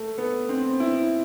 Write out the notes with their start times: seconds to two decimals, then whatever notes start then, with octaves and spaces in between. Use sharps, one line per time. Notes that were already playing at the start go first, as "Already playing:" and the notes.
Already playing: A3
0.18 B3
0.49 C4
0.80 E4